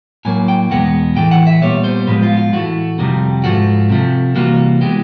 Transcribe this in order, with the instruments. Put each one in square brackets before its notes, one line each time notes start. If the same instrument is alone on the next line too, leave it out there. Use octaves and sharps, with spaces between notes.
[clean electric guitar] A2 F#3 A#3 G#5
G5
E2 B2 G#3 B3 F#5
A2 E3 A3 G5
F#5
E5
A#2 G3 B3 C#5
C5
A2 F3 G#3 B3 B4
F4
F4
A2 E3 A3 F#4
F2 C3 D#3 G3
G#2 F3 A3 F#4
C3 F3 A3
C3 E3 G3 A#3 F#4
E3 G#3 B3 G4